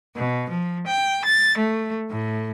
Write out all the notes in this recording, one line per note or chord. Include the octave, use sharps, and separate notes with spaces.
B2
F3
G5
A6
A3
A2